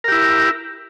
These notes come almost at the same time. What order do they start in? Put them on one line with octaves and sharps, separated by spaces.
A#4 G4 E4